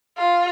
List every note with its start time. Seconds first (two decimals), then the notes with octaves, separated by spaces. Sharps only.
0.17 F4